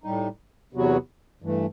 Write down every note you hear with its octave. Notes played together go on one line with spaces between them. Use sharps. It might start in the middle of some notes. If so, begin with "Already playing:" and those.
A2 G3 D#4
E2 C3 F#3 B3 F#4
G2 E3 A3